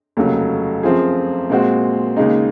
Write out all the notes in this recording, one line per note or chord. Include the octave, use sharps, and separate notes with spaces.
F1 D#2 C#3 F#3
F#2 F3 C4 F4 G#4
A#2 G#3 C4 F#4
D#2 C#3 G#3 D#4